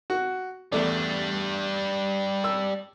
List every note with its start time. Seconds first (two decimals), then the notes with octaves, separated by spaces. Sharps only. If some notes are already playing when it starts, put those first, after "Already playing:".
0.10 F#4
0.72 E2 G3 A3 D4 D5
2.44 E6